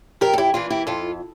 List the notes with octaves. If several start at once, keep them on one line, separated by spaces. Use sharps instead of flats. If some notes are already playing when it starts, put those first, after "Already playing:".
F2 G4 A#4
A4
E4 G4
E3 A#3 D4 F4
E4 G4
F2 F4 A4